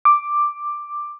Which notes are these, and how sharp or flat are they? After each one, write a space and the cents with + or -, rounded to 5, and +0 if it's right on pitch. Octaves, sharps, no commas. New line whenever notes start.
D6 +5